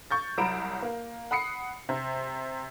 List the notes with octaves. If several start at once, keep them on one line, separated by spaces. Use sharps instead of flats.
C#6 G6 A6
C2 F#3 A#5 B5 D7 E7
A#3
F#5 B5 D#6 C7 C#7
C3